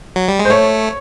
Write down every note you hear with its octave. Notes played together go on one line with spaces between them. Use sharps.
F#3
G3
G#3
C5
A3 C#5